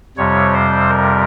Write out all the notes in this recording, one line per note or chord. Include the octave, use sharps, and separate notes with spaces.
F2 C3 G3 C#5
C5
A#4